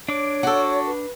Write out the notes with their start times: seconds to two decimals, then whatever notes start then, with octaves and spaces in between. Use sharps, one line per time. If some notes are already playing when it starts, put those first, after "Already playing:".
0.09 D4 C#5 D6
0.43 F#4 A4
0.86 B4